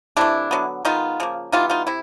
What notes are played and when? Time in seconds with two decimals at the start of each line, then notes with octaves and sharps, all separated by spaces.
0.17 C3 E3 A3 D4 E4
0.51 D3 F#3 B3
0.85 D#3 G#3 B3 D#4 F4
1.20 C#3 F3 A#3
1.52 E3 G3 B3 D#4 F4
1.70 D#4 F4
1.87 C3 E4